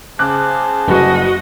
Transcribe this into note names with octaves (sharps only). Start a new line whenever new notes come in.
C#3 G#4 C5 A5 D6 F#6
F#1 G3 F#4 B4 D#5